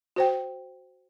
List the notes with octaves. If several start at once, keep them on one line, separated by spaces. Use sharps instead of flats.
F#4 C5 G5